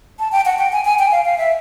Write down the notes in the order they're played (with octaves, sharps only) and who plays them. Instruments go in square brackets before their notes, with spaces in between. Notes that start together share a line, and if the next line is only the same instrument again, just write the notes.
[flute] A5
G5
F#5
G5
G#5
G#5
G5
F5
F5
E5